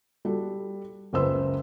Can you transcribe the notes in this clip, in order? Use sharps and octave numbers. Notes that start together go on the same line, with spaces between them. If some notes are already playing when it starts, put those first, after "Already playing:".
G3 F#4 A4
F#1 C#2 B4 C5 E6